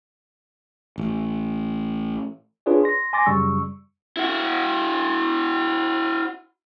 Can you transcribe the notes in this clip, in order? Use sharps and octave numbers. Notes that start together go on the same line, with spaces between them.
A1
D4 F4 G#4 B4 C#5 D5
C6 A#6
G#5 C6 D6 A6 A#6
F#2 C#3 G3 C#6 E6
E4 F#4